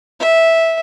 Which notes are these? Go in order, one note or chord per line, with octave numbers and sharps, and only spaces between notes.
E5